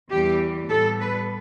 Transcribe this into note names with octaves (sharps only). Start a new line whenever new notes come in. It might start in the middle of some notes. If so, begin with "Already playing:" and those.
E2 E3 G3 G4
A2 G3 B3 A4
B4